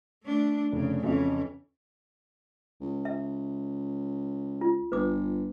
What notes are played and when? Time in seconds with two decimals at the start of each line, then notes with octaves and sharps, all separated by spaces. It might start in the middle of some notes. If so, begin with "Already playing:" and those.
0.24 A3 D4
0.72 F1 C#3
1.04 F2 C#3 E3 C#4
2.81 C#2
3.05 E5
4.61 F4
4.92 G1 B4 D6